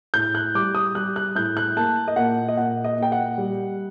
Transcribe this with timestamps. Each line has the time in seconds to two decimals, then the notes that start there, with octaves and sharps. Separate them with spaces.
0.14 A2 G6
0.35 F#6
0.55 G3 D6
0.75 D#6
0.95 G3 F#6
1.16 F#6
1.36 A2 G6
1.57 F#6
1.76 A#3 A5
2.08 D#5
2.16 A#2 F#5
2.48 D#5
2.57 A#2 F#5
2.84 D#5
2.98 A#2 G5
3.12 F#5
3.38 G3